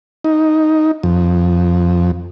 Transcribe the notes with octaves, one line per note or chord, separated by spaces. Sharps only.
D#4
F2